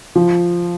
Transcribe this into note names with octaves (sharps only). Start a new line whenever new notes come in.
F3